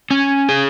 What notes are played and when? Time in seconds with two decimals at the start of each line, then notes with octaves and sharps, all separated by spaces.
0.11 C#4
0.49 G#4